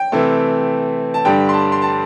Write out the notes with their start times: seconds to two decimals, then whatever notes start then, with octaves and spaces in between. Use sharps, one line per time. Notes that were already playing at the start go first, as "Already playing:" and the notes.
Already playing: G5
0.12 C3 E3 A3
1.14 A5
1.25 G2 D3 G3 G5
1.49 C6
1.54 A5
1.72 C6
1.82 A5